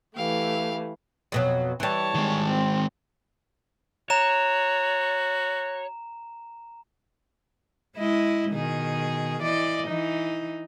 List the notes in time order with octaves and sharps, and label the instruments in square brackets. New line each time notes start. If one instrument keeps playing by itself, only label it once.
[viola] E3 A3 [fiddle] G4 F5
[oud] F2 B2 F#3
[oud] E3 G3 [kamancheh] C#5 A5
[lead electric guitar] D#3 G#3
[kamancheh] C4
[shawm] F#4 [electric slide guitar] C#5 [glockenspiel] A#5 E7
[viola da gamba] G#3 E4 D#5
B2 D#3 G#4
E3 D5 D#5
E3 D#4